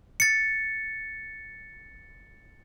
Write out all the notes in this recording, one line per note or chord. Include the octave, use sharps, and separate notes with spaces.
A6 C#7